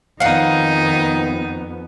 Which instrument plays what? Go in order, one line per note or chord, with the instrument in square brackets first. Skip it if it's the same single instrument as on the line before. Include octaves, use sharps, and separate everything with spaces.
[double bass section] F2 B3 [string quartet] D#3 D#4 [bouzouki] F5 F#5